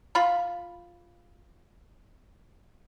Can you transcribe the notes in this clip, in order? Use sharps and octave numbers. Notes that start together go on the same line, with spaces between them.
F4 B5